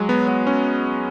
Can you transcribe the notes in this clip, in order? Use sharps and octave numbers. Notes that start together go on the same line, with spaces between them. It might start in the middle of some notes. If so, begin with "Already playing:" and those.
Already playing: F#3 G#3
B3
B3
C#4